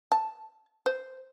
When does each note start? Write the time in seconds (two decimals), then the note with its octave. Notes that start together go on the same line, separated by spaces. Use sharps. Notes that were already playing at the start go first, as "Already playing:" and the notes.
0.12 A5
0.86 C5